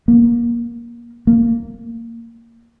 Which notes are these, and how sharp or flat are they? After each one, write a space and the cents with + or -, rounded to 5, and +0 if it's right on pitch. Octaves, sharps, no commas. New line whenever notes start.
A#3 +20
A#3 -15